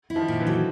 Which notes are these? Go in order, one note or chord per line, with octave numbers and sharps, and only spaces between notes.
E4
D#3 F3
A#2
D3 E3
F#3